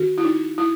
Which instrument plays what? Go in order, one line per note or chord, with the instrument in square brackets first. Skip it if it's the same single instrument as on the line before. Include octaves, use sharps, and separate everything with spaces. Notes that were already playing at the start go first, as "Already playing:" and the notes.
Already playing: [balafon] D#3 F#4
E4
D#4
E4